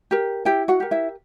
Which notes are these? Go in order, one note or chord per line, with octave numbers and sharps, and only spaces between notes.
G4 A#4
E4 G4 G5
F#4 F#5
G4 A#4
E4 E5